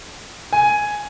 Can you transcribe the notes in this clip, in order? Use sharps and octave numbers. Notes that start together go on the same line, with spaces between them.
G#5